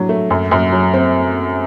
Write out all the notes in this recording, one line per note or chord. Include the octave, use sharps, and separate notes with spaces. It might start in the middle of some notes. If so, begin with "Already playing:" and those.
Already playing: A2 F#3 D4
A3
F#2
F#2
F#3
C4